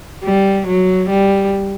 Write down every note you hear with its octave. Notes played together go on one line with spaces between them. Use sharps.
G3
F#3
G3